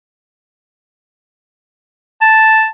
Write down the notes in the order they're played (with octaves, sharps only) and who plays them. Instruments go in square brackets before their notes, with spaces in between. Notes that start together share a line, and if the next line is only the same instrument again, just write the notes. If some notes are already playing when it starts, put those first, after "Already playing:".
[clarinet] A5